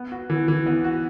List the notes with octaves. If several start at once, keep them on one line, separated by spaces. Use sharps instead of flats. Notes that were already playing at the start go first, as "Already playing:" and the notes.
Already playing: B3
F#4
E3
E3
B3
F#4